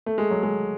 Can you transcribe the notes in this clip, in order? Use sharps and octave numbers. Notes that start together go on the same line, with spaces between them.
A3
G#3
F#3
G#3